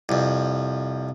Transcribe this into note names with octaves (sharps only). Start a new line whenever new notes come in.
C2 F2